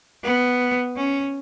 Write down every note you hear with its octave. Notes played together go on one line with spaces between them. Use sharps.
B3
C#4